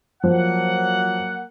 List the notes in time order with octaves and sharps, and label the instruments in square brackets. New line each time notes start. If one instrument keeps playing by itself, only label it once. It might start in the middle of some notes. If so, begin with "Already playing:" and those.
[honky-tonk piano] F3 [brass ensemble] F#3 A#3 F#5